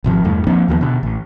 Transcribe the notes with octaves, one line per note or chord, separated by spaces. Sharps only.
G#1 C3 F3
E2 G2 A3
F3 A#3 C4 D4
D#2 F3 G3 B3
B2 D3
A1